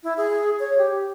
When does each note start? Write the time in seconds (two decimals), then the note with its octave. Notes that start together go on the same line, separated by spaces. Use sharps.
0.03 E4
0.17 G#4
0.60 C#5
0.78 G4